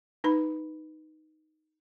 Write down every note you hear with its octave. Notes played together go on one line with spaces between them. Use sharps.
D#4 B4 B5